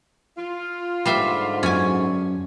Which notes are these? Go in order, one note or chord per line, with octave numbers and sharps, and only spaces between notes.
F4
G#2 D3 G3 C5 E5
F#2 C#4 G#5